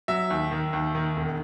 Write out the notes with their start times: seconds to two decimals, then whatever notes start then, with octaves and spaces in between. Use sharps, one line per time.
0.08 F#3 E5
0.30 D#2
0.51 D#3
0.73 D#2
0.95 D#3
1.16 E1